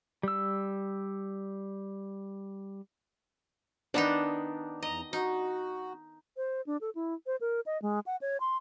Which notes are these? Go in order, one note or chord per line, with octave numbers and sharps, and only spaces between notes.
G3 E6
D#3 B3 D4 D#4
E2 D#5 A#5
D#4 F#4
C5
D4
A4
E4
C5
A#4
D#5
G#3
F#5
C#5
C6